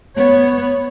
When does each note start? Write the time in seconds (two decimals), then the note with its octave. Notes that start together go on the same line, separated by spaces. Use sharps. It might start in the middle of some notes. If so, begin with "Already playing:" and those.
0.16 B3 C#5